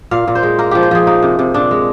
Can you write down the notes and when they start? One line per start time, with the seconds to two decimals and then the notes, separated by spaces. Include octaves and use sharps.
0.11 A#2 F5
0.27 A#2
0.35 C5
0.43 G#3
0.58 A#3 A#4
0.71 F3 G4
0.83 C5
0.91 F3 G#4
1.07 A#3 D#4
1.22 C3
1.39 C3
1.54 A#2 D4
1.71 G#3